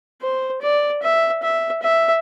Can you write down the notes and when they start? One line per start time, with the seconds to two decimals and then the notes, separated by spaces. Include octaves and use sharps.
0.22 C5
0.62 D5
1.02 E5
1.43 E5
1.82 E5